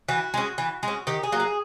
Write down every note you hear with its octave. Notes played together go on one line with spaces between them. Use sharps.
E3 F#4
G#3 C#4
E3
G#3 C#4
D#3 G4
G#4
F#3 A#3
G#4